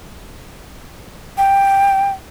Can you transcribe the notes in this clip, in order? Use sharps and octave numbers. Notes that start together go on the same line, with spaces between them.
G5